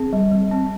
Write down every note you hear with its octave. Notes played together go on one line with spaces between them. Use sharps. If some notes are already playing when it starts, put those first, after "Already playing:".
Already playing: C4 G#4
G3
G3
C4